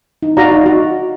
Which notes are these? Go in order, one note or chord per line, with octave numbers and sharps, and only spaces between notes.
D#4
F#4 D5 F5 A#5
D#4
F#4